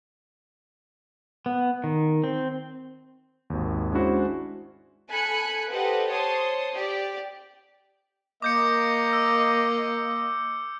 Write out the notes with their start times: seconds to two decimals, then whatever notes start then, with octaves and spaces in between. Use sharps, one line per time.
1.46 B3
1.84 D#3
2.24 C4
3.50 G#1 D#2
3.92 G#3 C#4 D4 E4 F#4 C5
5.10 A4 G#5 B5 F#6 C#7
5.71 G4 A4 B4 C5 D#5 F#5
6.11 C5 C#5 A5 C6 D#6
6.73 G4 D5
8.42 A#3 D#5 D6 G6 C#7
9.13 E6